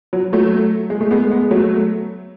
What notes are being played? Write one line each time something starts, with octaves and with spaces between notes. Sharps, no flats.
F#3
F#3 A3
G#3
A3
G#3 B3
G#3 B3
F#3 A3